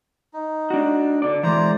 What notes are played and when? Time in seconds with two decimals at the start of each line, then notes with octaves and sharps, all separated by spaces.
0.33 D#4
0.70 D4 F#4
1.22 D3 D5
1.43 E3 G#3 C5 D5 A#5